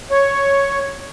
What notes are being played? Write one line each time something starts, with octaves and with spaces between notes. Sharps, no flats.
C#5